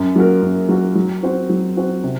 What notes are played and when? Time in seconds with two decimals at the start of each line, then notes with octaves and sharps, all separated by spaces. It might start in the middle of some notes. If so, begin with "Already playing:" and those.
Already playing: F#2
0.16 F#3 A#3 F#4 A#4
0.42 F#2
0.69 F#3 A#3 F#4 A#4
0.95 F#3
1.23 C4 F#4 C5
1.49 F#3
1.77 C4 F#4 C5
2.04 C3